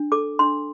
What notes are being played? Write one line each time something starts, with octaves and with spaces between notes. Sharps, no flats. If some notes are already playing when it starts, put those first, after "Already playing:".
Already playing: D4
A4 D6
D4 C6